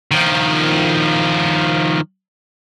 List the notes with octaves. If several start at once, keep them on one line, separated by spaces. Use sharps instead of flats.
D#3 F3